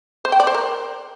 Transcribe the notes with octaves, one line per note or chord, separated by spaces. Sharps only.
C5
G5
D5
C5
A#4